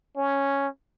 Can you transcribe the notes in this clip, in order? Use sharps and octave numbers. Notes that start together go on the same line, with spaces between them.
C#4